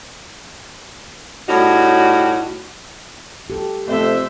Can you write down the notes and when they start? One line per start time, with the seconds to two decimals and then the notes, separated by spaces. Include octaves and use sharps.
1.49 A2 G3 C#4 D#4 F#4
3.50 G4 A4
3.88 F2 C3 F3 A3 C5 E5